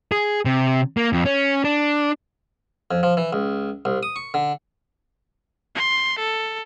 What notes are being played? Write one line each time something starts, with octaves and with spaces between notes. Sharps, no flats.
G#4
C3
A#3
F2
C#4
D4
F2
F3
E3
C#2
C2
D#6
C#6
D3
C6
A4